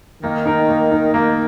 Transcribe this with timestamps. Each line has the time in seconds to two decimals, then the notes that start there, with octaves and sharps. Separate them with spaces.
0.23 D#3 A#3
0.46 D#4 A#4
0.69 A#3
0.91 D#4 A#4
1.14 D#3 A#3